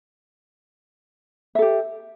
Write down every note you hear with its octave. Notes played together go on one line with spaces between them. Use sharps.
G4 A4 E5